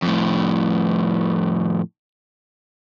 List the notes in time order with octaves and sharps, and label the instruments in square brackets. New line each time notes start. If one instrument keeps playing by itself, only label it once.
[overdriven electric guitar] F2 A2